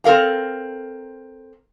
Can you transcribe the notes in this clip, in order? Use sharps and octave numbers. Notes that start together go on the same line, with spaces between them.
C4 A4 A#4 F5 A#5